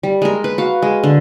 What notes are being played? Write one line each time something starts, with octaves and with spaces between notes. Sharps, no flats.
G3
G#3 A#4
B4
F#4 F5
G#3
D3